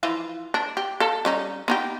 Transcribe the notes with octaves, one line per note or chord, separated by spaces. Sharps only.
E3 F3 F4
D4
G4
A4 F5
G3 C#4 D#4
B3 D#4 G4